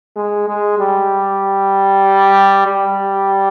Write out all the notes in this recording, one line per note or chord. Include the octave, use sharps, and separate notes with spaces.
G#3
G#3
G3
G3